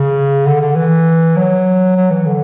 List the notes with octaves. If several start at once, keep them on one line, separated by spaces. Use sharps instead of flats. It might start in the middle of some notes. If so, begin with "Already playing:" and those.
Already playing: C#3
D3
D3
E3
F#3
F#3
E3
D3